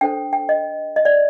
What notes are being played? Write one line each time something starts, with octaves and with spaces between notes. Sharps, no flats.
D4 A4 C5 G5
G5
D#5
D#5
D5